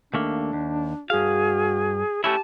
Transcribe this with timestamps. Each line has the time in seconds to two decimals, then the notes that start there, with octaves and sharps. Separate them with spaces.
0.14 D#2 A3 A#3 D4
0.53 D#2
1.10 G2 F#4 G#4 F5
2.24 A3 C#4 E4 G4 A5